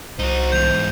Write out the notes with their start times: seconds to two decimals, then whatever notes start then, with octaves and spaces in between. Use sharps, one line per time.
0.19 C2 D#4 F#4 C5
0.52 E2 G#2 G6 F7